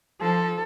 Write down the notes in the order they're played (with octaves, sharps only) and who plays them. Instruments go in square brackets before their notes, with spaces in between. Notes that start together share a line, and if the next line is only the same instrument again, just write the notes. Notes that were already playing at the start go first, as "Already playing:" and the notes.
[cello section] F3 [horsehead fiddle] A4